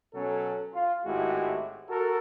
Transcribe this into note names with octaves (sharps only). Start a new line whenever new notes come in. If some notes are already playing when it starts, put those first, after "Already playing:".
B2 F#3 C#4 A4
F4
G#1 A2 G#3 E4 F#4 G4
F#4 A4 A#4